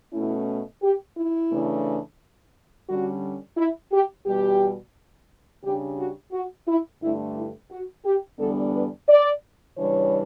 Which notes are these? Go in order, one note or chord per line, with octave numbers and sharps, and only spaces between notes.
B2 A3 C#4 E4
G4
E4
C#3 E3 A3 D4
D3 G3 C#4 F#4
E4
G4
E2 B2 G3 G4
C#3 G3 D4 G4
F#4
F#4
E4
G2 D3 A3 E4
E4
F#4
G4
E2 D3 G3 B3 D4 A4
B4
D5
C#3 E3 G3 D4 C#5